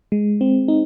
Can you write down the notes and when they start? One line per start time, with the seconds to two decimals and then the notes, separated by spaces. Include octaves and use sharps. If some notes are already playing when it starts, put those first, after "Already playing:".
0.12 G#3
0.41 C4
0.68 D#4